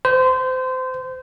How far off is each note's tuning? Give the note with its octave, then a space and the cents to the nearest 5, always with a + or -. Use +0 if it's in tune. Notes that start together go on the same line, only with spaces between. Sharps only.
C5 -25